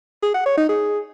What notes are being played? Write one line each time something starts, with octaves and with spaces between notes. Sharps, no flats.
G#4
F#5
C#5
D#4
G#4